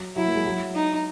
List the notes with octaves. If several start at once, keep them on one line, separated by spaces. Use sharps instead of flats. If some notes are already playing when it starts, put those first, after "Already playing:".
Already playing: F#3
F#3 E4
A#3
G#3
F#3
D#4